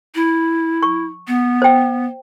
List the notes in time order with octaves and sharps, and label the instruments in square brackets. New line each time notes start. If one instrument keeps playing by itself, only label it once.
[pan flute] E4
[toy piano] C#6
[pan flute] B3
[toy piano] C5 G5